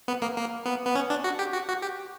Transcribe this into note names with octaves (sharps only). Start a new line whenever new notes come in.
B3
A#3
A#3
B3
B3
C#4
D4
F#4
G4
F#4
F#4
G4